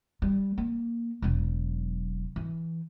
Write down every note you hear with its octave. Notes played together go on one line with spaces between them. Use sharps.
G3
A#3
E1 F#3
E3